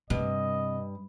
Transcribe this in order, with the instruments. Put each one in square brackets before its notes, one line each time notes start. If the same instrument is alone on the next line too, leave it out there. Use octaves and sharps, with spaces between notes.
[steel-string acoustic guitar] G2 [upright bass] C3 [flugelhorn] D#5